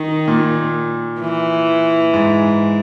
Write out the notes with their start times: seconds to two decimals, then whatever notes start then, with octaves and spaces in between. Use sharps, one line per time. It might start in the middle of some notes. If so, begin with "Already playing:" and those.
Already playing: D#3
0.28 A#2
1.21 E3
2.14 G#2